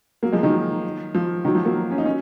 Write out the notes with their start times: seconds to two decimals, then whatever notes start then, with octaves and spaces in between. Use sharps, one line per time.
0.23 F#3 A#3
0.32 F3 G#3
0.43 D#3 F#3
1.14 F3
1.45 D#3 F#3
1.55 F3
1.65 F#3 A#3
1.91 C#4
1.98 D#4
2.05 C#4